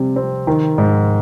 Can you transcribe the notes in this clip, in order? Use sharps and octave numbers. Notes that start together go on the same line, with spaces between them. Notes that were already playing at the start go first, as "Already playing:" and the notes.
Already playing: C3 G3
C4
D#3
G#2